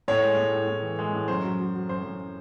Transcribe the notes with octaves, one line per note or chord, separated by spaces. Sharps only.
A2 C#5
G#3
A2
A2
A2
E3
G#3
A2
F#2 C5
F#3
F#3
F#3
F#2 C5
F#2